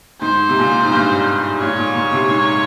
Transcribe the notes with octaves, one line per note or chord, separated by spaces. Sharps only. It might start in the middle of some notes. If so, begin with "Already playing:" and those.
G#2 C5
C3
A#2
G#2
G#2
G2
G#2 C#5
A#2
A#2
C3
G#2